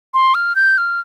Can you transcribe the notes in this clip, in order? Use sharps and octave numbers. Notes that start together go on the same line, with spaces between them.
C6
F6
G6
F6